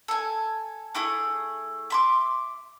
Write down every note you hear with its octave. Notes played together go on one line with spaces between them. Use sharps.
A4 G#5
A3 E4 G#4 D#6
E5 C6 D6